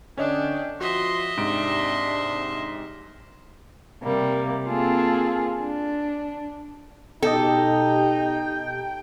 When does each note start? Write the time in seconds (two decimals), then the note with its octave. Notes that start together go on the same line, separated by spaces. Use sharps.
0.17 D3 C#4 D4 C#5 D#5 G5
0.81 F3 F#4 D#5 E5 C6
1.37 G#2 C3 D4 C6 D7
4.03 C3 G3 A#3
4.67 A#3 C4 F4 G#4 A4
5.59 D4
7.22 B2 D#4 G4 A4 D#5 G5